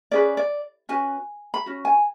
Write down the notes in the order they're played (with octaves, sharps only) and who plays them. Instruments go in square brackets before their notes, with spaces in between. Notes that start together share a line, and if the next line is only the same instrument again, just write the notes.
[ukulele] C#4 G#4 B4 D5
D5
C#4 F#4 B4 G#5
B5
C#4 F#4
G#5